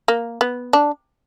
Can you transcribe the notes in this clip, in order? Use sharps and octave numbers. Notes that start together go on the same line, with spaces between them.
A#3
B3
D4